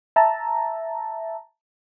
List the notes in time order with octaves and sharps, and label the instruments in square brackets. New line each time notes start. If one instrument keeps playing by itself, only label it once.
[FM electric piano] E5 A5 A#5